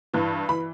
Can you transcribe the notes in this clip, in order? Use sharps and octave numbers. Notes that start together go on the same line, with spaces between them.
G2 E3
E3 B5